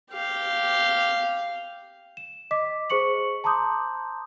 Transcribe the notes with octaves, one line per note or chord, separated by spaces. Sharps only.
G4 F5
E7
D#5 D6 B6
G#4 C5 C#6 C#7 F#7
A5 A#5 C6 D6 D#6 G6